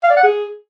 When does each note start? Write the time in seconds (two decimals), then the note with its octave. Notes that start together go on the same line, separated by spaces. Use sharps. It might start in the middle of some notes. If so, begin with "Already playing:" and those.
0.03 F5
0.10 D5
0.17 F#5
0.23 G#4